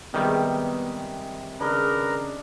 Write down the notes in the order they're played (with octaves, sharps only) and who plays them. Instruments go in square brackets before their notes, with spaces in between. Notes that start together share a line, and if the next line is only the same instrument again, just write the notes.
[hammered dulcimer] C3 G#3 [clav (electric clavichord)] D#3 G3 [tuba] B3
[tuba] C#3 [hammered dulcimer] D4 G#4 D#5 [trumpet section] A#4 B4